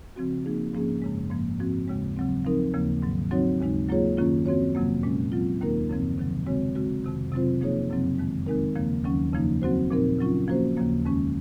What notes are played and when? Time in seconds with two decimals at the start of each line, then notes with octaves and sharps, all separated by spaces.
0.16 C#3 F3 C4 F#4
0.45 F3 A#3 D#4 G#4
0.73 G#2 F3 A#3 C#4 G#4
1.02 F#2 C#3 G#3
1.31 G#2 F3 A#3
1.59 G#2 F3 C4 F#4
1.88 D#2 C#3 G#3
2.17 C#3 F#3 C4
2.45 F3 C4 D#4 A#4
2.74 D#2 C#3 F3 A#3
3.02 G#2 D#3 F#3
3.31 F#3 C4 D#4 F#4 C#5
3.60 D#2 C#3 G#3 D#4
3.89 F#3 A#3 F4 G#4 C#5
4.17 F#2 D#3 A#3 C#4 F4
4.46 F3 C4 F#4 C#5
4.75 F2 C3 F#3 A#3
5.03 A#2 G#3 C#4
5.32 F#3 C4 F4
5.61 D#2 D#3 A#3 D#4 A#4
5.89 F#2 C#3 F3 C4
6.18 C3 D#3 F#3
6.46 C#3 G#3 C4 F#4 C#5
6.75 C#3 G#3 C4 F#4
7.04 F2 C3 D#3
7.32 C3 F#3 C4 F4 C5
7.61 F3 A#3 D#4 G#4 C#5
7.90 F#2 C#3 F#3 C4
8.18 F2 D#3 G#3
8.47 D#3 G#3 C4 D#4 A#4
8.75 D#2 C#3 F3 A#3
9.05 D#2 D#3 F#3 C#4
9.33 F2 C#3 F3 A#3 D#4
9.62 F#3 C4 F#4 C5
9.91 A#2 F3 C4 D#4 A#4
10.19 C#3 F#3 C#4 F4
10.48 F3 A#3 C#4 F#4 C5
10.77 D#2 C#3 F3 A#3
11.05 F2 D#3 G#3 C#4